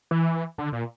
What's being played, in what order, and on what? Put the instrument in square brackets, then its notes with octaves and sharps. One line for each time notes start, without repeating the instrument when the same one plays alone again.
[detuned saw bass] E3
D3
A#2